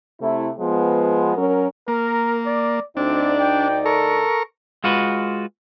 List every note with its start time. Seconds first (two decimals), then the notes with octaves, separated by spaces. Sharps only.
0.21 C3 A3 E4
0.58 F3 G#3 B3
1.36 F#3 C#4 A#4
1.88 A#3 A#4
2.46 D5
2.97 D2 C4 D4 D#4 D5
3.40 G5
3.86 A4 A#4 C#6
4.84 G#3 F4 F#4 B4